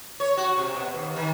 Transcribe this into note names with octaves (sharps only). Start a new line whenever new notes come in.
C#5
F#4
C3
B2
D#2
D#3